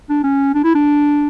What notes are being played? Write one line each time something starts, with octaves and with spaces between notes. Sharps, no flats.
D4
C#4
D4
E4
D4